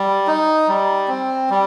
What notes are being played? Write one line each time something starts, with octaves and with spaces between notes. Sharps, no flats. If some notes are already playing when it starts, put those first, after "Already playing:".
Already playing: G3
D#4
G3
C4
G3